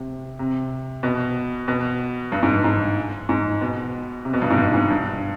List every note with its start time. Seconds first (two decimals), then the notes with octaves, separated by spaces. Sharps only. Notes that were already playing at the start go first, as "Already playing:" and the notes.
Already playing: C3
0.39 C3
1.03 B2
1.68 B2
2.32 G2
2.43 G#2
2.53 G2
2.64 G#2
3.29 G#2
3.61 B2
4.25 C3
4.33 B2
4.42 G2
4.50 G#2
4.58 G2
4.74 G#2
4.90 G2